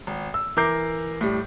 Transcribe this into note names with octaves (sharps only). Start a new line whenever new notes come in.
G#1
E6
E3 A#4 D6 G6 C7
A2 G3